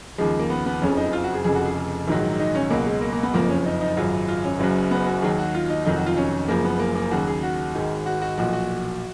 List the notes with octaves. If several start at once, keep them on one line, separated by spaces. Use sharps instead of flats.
D#2 C#3 F3 G#3
G#3
A#3
B3
B3
F#1 F2 C#3 F3 C#4
D#4
F4
F#4
G#4
F1 F2 C#3 G#4
F#4
G#4
A#1 G#2 D#3 F#3
D#4
C#4
C#2 B2 F#3 A#3
G#3
A#3
A#3
B3
F#1 F2 F3 A#3
C#4
D#4
D#4
G#1 F#2 C#3 F#3 F4
F4
C#4
F#1 F#2 C#3 F#3
B3
F#4
D#2 D#3 F#3 G#4
F#4
F4
D#4
F1 F2 D#3 F#3 D#4
F#4
F4
C#4
F#1 F#2 C#3 F3 A#3
B3
A#3
A#3
D#2 C#3 F#3 F#4
G#4
F#4
G#1 G#2 D#3
F#4
F#4
B1 A#2 F3 F#4
F#4